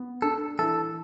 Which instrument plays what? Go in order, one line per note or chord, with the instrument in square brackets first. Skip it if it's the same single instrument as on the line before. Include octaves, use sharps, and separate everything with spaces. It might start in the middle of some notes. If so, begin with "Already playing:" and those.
Already playing: [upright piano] B3
[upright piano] D4 [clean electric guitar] A4
[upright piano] E3 [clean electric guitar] A4